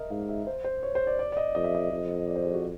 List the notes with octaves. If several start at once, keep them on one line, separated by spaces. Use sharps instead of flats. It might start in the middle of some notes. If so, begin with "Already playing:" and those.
Already playing: A#4 D#5 E5
G#2 F5
E5
C5
C5
C#5
C5
D5
D5
D5
D#5
F2 D#5
E5
D#5
F2
D5
C5
G#4
F#4